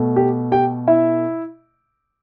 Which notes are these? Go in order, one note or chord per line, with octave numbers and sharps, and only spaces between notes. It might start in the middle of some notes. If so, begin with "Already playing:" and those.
Already playing: B2 A3
G4
G4 G5
E4 E5